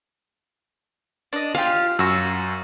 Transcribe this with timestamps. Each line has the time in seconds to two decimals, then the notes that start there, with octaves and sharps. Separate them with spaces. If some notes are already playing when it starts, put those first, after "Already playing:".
1.33 D4 D#5
1.55 F4 G4 F5
1.99 F#2 F#4 E6